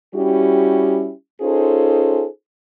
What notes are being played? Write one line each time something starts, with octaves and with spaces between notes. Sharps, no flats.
G3 C#4 E4 F#4 G4
C#4 D#4 F4 G#4 A4 C5